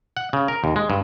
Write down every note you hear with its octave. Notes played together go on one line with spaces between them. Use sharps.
F#5
C#3
A#4
D#2
G#3
G2